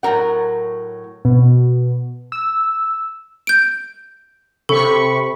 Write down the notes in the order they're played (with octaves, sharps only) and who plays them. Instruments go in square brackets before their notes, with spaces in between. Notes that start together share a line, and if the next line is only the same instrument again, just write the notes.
[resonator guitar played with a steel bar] A2 F#3 A#4 F#5
[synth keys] B2
E6
[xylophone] G6 D7
[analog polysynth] C3 B5 C#6 [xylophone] A4